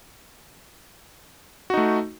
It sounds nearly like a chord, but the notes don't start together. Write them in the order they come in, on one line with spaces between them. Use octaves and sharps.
F#4 D#4 A3